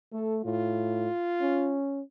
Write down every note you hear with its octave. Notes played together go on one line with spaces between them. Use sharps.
A3 A4
A2 F4
C#4